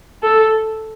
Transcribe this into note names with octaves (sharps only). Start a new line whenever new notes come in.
A4